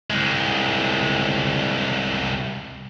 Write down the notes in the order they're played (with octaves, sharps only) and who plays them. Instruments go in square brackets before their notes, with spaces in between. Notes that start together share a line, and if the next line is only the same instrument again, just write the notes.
[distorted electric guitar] C2 G#3